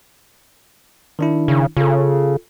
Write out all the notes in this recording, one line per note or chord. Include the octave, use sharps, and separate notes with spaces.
D#3 D4 E4
C#3
C#3 F4 A4